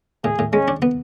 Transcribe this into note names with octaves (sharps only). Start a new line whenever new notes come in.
A2 G#4
A2
G#3 C#4
D4
B3